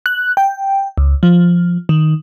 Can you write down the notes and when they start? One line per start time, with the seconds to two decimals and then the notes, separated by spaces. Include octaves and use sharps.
0.06 F#6
0.37 G5
0.98 C#2
1.23 F3
1.89 D#3